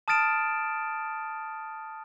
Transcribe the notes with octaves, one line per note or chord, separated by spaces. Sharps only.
A5 D#6 F6 A6 D7 E7